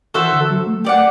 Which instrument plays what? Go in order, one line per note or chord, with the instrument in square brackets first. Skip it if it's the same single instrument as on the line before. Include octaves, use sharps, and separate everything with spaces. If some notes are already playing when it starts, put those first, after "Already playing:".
[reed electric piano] E3 [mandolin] F#4 A4 C5 E5
[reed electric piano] D3
F#3
A3
[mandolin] G4 D5 F#5